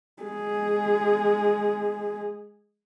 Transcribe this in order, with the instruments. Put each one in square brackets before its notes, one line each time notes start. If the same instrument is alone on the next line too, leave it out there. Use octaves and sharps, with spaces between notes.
[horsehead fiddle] G#3 G#4